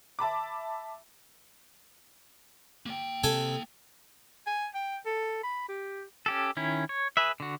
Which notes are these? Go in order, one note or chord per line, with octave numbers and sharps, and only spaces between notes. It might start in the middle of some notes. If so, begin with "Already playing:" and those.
E5 A5 B5 D6
A#3 G5
C3 A4 G#5 A5
G#5
G5
A4
B5
G4
C#4 G4 A4
D#3 C#4 E4
C#5
G#4 B4 E5
D3 F#4